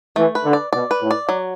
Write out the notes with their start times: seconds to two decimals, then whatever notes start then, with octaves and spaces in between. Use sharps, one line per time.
0.16 E3 A3
0.35 B4
0.43 D3
0.53 D5
0.73 B2 D5
0.91 B4
1.01 A2
1.11 D5
1.29 F#3